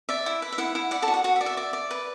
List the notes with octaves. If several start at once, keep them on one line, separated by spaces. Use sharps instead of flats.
D5 E5
E4
B4
E5
E4 F#5
E4
D5 F#5
A4 A5
F#4
F#5
F#4 F#5
E5
D5
E5
D5
D5
B4